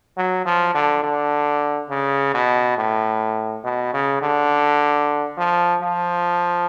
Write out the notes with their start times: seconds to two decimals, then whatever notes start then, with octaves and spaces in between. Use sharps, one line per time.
0.17 F#3
0.46 F3
0.74 D3
1.03 D3
1.90 C#3
2.34 B2
2.78 A2
3.64 B2
3.93 C#3
4.22 D3
5.37 F3
5.81 F3